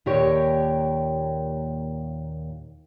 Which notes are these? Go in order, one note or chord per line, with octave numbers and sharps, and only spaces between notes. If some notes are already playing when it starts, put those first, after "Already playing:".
D#2 A#2 G4 A#4 C#5 G5